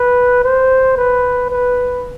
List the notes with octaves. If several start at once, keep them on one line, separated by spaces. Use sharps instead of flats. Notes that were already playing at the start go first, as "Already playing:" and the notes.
Already playing: B4
C5
B4
B4